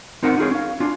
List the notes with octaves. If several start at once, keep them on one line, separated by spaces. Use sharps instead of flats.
C4 D#4 A#4 C5 F#5
D#4 F4 G#4 C#5
C#4 F5
C#4 D4 F4